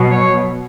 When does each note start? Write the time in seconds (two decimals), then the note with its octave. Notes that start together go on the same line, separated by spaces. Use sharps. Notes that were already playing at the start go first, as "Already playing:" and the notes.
Already playing: B2 F#3
0.11 C#5